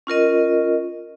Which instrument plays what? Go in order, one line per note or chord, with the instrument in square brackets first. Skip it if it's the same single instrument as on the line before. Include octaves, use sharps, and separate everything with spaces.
[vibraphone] C#4 F4 A#4 D#5